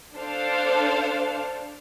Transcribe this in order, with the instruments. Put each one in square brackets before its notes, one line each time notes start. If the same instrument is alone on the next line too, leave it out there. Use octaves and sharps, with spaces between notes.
[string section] D4 A4 C5 F5